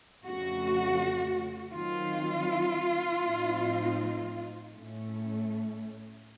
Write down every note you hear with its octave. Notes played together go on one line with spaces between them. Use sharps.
F2 C#3 A3 F#4
D#3 F#3 C4 F4
A2 F3 C4 D#4
A2 A3 C#4